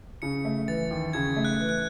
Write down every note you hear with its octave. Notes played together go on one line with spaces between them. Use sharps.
C#3 C#7
A3
E3 A6
D#2
C#3 G#6
A3
F#6
E3
F#6